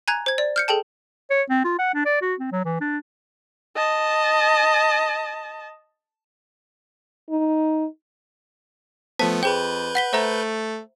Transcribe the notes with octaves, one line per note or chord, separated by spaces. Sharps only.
G#5 A#5 F#6 G#6 F7
C5 G#6
D5
F6 G6 C#7
G#4 A4 G5 A5
C#5
C4
F4
F#5
D4
D5
F#4
C4
F#3
E3
D4
D#5 A5
D#4
F3 A3 B3 C5 A5 B6
F2 G#4 B4 C5 G5 G6
F#5 B6 G7
A3 C5 E5 A#5